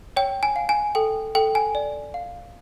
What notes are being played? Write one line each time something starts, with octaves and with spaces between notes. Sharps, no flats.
C#5 G5
G#5
F5
G#5
A4 G5
A4 G5
G#5
D5
F5